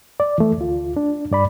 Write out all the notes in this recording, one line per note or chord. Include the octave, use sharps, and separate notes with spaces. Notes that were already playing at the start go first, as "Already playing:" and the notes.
D5
E3 A3
D2 F4
D4
G2 D5 B5